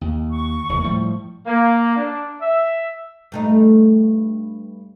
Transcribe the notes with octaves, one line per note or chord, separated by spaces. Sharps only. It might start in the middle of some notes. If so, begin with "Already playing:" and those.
D#2
C#6
E1 D#2 C#3
A2 F3 G3
A#3
D4
E5
G2 A3 D#4